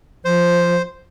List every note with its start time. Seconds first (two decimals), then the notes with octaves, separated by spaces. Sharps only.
0.25 F3 C5